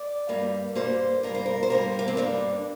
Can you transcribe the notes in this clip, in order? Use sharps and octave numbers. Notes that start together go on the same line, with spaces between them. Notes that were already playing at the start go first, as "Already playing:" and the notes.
Already playing: D5
G2 G3 A#3
G2 G3 A#3 C5
G2 G3 A#3 A#4
C5
A#4
C5
G2 G3 A#3 A#4
A#3
C4
G2 G3 A#3 D4